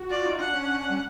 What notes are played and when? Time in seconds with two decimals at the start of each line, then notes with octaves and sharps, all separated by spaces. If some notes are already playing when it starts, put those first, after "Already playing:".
Already playing: F#4
0.10 F4 D5
0.25 D#4
0.39 D4 F#5
0.53 C#4
0.90 G3